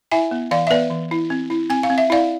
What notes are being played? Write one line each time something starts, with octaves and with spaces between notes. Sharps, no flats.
E4 E5 G#5
B3
E3 D5 F5
E5
B3 B4 D5
E3
E4
C4
E4
C4 G#5
F5
C4
E5
E4 D5 F5